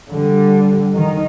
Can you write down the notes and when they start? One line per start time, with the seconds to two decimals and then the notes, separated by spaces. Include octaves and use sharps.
0.10 D3 G3
0.94 D#3 D#4